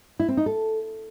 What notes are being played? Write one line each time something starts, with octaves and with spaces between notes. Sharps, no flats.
E4
C4
D#4
A4